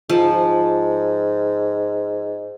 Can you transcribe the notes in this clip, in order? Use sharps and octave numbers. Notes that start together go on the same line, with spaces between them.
G#2 F3